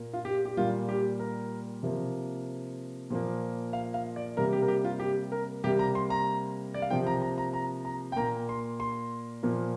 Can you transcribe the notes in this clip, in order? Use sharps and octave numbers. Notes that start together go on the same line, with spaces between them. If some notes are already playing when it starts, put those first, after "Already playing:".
Already playing: A#2 A#3
F4
G4
G4
A#2 G3 A#3 F4
G4
A#4
C3 F3 A#3
A#2 F3 A#3
F5
F5
D5
C3 G3 A#3 A#4
G4
A#4
G4
F4
G4
A#4
C3 G3 A#3 G4
A#5
C6
A#5
D5
F5
C3 F3 A#3 G5
A#5
A#5
A#5
A#5
A#5
G5
A#2 A#3 A#5
C6
C6
A#2 F3 A#3